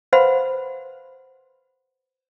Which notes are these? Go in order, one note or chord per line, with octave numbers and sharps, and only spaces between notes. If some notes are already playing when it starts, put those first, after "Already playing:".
B4 C5 F5 F#5 B5 C6